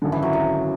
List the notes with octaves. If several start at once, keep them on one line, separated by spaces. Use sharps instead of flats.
G#1 F#2 D3
E3
F#3
F#3